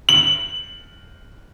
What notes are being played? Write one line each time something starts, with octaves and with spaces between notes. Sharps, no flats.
F#7